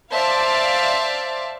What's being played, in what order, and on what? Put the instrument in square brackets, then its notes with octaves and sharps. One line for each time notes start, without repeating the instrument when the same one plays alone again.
[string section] C5 D5 E5 F5 A5